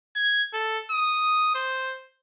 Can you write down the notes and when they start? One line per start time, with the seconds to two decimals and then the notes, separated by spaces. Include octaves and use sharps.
0.16 G#6
0.53 A4
0.91 D#6
1.55 C5